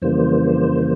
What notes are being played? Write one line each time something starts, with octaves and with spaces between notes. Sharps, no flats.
F2 C#3 E3 G3 A#3 C5